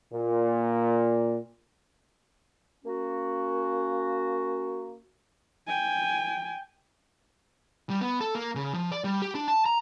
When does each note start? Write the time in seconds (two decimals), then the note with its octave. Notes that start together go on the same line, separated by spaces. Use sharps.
0.13 A#2
2.85 A#3 C#4 F#4
5.68 G5 G#5
7.90 G3
8.01 B3
8.20 A4
8.35 A#3
8.55 C#3
8.74 F3
8.92 D5
9.04 G3
9.22 G4
9.35 D4
9.48 A5
9.66 A#5